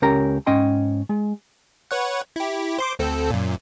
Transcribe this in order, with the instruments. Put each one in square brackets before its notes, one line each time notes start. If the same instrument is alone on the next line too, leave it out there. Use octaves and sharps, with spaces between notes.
[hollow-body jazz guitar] C#2 C#4 G4 A#4 A#5
G#2 C#4 D#5 G5 C6
G#3
[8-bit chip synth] B4 C#5 F#5
E4 G4
C5 C6 D6
D2 C4 A4
F#2 A#2